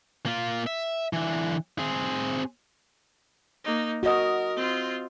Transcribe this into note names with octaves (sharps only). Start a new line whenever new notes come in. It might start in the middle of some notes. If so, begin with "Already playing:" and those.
A#3 F4
E5
D3 E3
C4 G#4
A#3 D#4
F#4 A#4 D#5
C4 F4